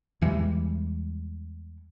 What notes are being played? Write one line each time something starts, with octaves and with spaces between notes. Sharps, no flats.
E2 E3 G3 G#3